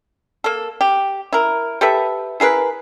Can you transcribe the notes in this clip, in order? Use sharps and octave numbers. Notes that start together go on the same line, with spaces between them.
A#3 A4
G4
E4 A#4
G4 A4 B4 E5
E4 G#4 A#4 B4